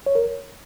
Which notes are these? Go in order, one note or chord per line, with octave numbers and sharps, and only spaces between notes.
C#5
A#4